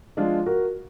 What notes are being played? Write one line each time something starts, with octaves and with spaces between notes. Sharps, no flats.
F3 G#3 D4 F4
F#4 A#4